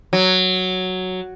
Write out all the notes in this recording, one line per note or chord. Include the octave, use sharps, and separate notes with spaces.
F#3